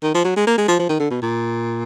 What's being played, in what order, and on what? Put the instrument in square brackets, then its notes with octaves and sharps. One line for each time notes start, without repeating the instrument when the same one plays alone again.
[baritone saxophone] D#3
F3
F#3
G#3
A#3
G#3
F3
F3
D#3
D3
B2
A#2